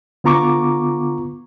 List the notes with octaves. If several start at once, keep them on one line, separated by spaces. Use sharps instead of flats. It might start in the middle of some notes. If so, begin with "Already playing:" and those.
D3 B3 F4 A#5 C#6 D6